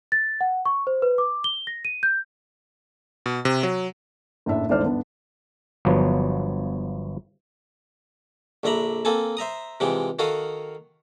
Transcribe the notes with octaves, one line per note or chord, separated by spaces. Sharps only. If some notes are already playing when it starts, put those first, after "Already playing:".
A6
F#5
C#6
C5
B4
D6
G7
A#6
D#7
G6
B2
C3
F#3
F#1 A2 D4 E5
G#1 D2 E3 C5 D5 F6
G1 B3 D4
G1 F3 F#3 B3
A#1 D3 E5 A#5 B5
A#3 C4 A4 G#5 A5
C5 E5 A#5 D#6
C3 E3 F3 G#3 G5
D#3 F#4 A4 F5 D#6